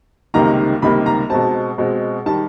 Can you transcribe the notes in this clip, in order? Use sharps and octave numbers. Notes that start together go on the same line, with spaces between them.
C#2 C3 D#3 G3 A#3 A#5
C#2 C3 D#3 G3 A#3 B5
A#5
B2 G#3 C4 A5
B2 G#3 C4
D#3 G3 A5